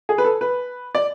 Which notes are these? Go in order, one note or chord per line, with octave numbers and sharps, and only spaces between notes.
G#4
B4
A4
B4
D5